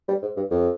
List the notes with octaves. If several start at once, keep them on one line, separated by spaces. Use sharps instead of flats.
G3
G#2
G2
F2